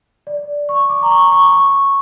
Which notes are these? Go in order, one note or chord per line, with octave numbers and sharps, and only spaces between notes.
D5
C#6
D6
A#5
C#6
C#6
D6
C#6